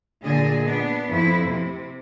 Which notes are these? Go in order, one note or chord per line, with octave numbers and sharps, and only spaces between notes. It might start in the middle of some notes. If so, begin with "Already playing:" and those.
A#2 D3 G#4 D#5
B3 D4
F2 E4
C3